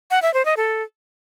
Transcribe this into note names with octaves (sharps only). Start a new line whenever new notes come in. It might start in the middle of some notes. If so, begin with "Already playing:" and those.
F#5
E5
C5
D#5
A4